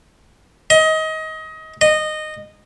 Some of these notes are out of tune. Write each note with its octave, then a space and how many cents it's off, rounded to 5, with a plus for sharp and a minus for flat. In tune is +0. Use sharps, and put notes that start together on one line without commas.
D#5 +25
D#5 -15